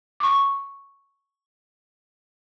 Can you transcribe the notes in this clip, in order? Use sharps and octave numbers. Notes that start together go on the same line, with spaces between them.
C#6 D6